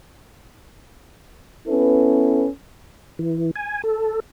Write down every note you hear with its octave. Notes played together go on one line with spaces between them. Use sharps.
B3 C#4 E4 A4 B4
E3
G#5
A4